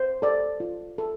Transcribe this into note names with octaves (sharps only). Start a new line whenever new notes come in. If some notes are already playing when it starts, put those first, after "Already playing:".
Already playing: C5
A4 D5
F4
A4